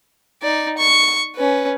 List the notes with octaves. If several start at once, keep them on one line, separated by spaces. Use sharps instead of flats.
D#4 D5
C#6
C#4 B4